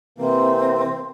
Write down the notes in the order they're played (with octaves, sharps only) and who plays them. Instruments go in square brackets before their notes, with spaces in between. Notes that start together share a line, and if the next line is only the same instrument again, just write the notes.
[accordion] C3 E3 A#3 [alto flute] C4